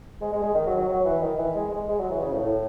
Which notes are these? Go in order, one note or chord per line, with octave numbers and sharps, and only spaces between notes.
G#3
G#3
G#3
D#3
F#3
F#3
F#3
E3
D#3
E3
G#3
G#3
G#3
F#3
E3
C#3
A2
A2